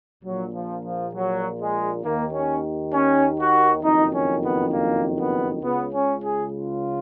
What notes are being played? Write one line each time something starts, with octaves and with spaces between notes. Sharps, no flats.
A#1 A#2 F#3
F3
F3
F#3
G#3
D#2 D#3 A#3
C#4
C#4
F#4
F#1 F2 D#3 D#4
C#4
B3
A#3
B3
C#2 C#3 B3
C#4
G#4
F4